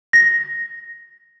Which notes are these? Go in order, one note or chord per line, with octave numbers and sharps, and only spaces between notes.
A#6